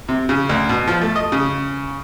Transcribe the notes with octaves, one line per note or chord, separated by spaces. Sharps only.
C3
C#3
D2
B2
F3
A3
D#5
C#3